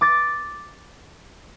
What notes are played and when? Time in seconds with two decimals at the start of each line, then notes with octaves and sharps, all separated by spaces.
0.01 D6 A6